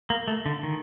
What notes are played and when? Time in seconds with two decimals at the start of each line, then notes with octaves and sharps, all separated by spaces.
0.10 A#3
0.28 A3
0.46 D3
0.63 D#3